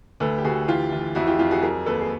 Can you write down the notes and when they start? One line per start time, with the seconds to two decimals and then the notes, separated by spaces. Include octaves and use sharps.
0.20 D2 A4 B4
0.38 G4
0.44 D2 F#4 G#4
0.68 E3 F4 G4
0.92 E3
1.15 F2 E4 F#4
1.27 F4 G4
1.39 F2 F4 G4
1.51 F#4 G#4
1.62 F#3 G#4 A#4
1.86 D#2 A4 B4
2.01 G#4